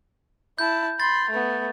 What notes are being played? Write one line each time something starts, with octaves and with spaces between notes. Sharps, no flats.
E4 A5 G6
B5 C6 A6
A3 B3